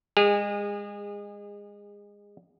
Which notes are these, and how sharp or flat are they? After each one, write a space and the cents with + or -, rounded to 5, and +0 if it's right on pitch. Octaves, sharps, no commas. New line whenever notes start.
G#3 -25 G#4 -35